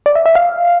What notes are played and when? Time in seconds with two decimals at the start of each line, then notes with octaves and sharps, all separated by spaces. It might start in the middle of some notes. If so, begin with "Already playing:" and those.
0.06 D5
0.15 E5
0.26 E5
0.35 F5